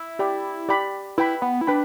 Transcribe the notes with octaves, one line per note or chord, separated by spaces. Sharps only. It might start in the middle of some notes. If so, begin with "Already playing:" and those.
Already playing: E4
G4 D5 G5 B5
G4 D5 G5 B5
E4 B4 G5 B5
B3
E4
D4 B4 G5 B5